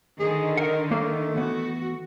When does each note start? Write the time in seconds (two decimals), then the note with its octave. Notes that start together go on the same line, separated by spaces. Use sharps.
0.20 D3 D#3 G#4
0.57 A#4 F#5
0.91 A3 A#3 F5
1.35 E3 B3 F#4